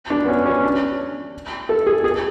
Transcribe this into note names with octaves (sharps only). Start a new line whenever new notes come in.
D4
B3
C#4
C#4
D4
A4
G#4
G#4